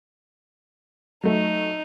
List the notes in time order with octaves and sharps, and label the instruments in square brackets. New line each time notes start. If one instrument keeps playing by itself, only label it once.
[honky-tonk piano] F#3 A3 [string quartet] D#4